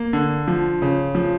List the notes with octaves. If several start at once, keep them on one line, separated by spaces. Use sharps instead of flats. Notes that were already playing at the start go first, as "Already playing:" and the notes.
Already playing: A#3
D3
F3
C#3
F3